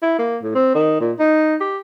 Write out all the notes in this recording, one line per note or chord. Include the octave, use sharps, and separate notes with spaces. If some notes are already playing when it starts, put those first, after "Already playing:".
E4
A#3
A2
C4
D#3
A#2
D#4
G4